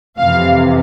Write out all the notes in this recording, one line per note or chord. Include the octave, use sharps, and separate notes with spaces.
F2 C3 E3 F5